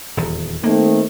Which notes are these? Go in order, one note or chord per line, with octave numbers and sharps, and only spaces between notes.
D#1 E2
D#3 A3 A#3 C4